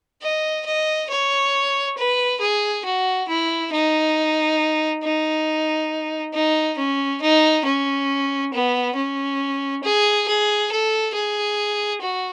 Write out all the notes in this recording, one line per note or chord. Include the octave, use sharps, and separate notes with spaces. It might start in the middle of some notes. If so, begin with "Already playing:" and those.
D#5
D#5
C#5
B4
G#4
F#4
E4
D#4
D#4
D#4
C#4
D#4
C#4
B3
C#4
G#4
G#4
A4
G#4
F#4